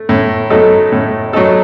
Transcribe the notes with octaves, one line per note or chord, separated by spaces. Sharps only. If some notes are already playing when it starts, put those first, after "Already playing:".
Already playing: A3
A2
F#3 A3 D#4 A4
A2
F#3 A3 D#4 A4